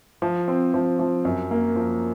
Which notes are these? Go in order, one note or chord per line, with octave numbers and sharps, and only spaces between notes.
F3
C4
F3
F3
F#2
A#3
F3